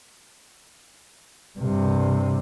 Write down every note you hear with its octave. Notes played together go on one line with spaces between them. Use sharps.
G2 C3